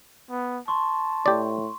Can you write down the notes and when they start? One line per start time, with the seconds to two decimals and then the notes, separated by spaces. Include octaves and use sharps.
0.30 B3
0.68 A5 C6 C#6
1.26 A2 G4 D5